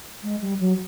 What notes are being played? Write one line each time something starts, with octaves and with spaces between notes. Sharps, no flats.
G#3
G3
F#3